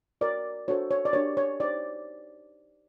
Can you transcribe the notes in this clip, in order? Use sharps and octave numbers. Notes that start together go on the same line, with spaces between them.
F#4 A#4 C#5 D5
D4 F#4 A4 C5 C#5
C#5
D5
D4 G4 A#4 C#5
C#5
D#4 G4 C5 D5